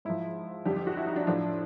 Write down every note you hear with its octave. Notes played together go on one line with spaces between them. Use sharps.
G#2 F3 E4
F2 D3 G3 G4
G4
F#4
E4
D#4
D4
A2 F3 D4